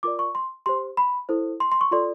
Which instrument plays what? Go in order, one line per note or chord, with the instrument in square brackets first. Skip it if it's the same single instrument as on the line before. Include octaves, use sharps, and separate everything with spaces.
[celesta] F4 A#4 D5 D6
C#6
C6
G4 C5 C6
B5
E4 A4 C5
C6
C6
C#6
F4 A4 D5 C6